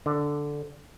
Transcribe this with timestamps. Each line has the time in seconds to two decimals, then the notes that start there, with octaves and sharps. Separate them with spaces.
0.06 D3